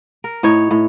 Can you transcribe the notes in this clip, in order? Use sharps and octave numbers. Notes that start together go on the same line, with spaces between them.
A#4
A2 D#4 C#5
A2